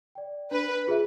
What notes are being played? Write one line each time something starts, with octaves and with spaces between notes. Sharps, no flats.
D5 G5
D4 B4
F4 G#4 B4 E5